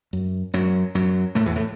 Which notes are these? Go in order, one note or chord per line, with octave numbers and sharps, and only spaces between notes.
F#2
F#2 F#3
F#2 F#3
A2 A3
E2 E3
A2 A3